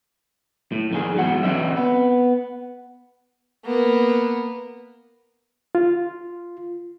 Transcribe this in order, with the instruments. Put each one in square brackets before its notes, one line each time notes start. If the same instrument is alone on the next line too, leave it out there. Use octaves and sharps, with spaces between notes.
[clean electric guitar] A2
F2 D#3 G#4
E2 G#2 F#3 F#5
E3 C4 C#4 D#5 E5
B3
[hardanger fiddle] A#3 B3
[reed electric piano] F4